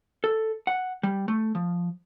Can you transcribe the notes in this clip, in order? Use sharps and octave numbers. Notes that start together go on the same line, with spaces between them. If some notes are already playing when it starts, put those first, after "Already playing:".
A4
F#5
G3
A3
F3